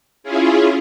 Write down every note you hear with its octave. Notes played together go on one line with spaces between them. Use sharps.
C#4 E4 F4 G#4